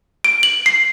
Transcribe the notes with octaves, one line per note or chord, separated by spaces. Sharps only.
D7
F#7
C7